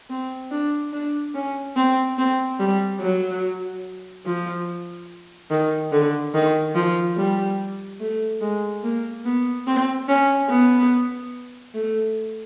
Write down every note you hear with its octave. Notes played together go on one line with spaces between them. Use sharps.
C4
D4
D4
C#4
C4
C4
G3
F#3
F3
D#3
D3
D#3
F3
G3
A3
G#3
A#3
B3
C4
C#4
B3
A3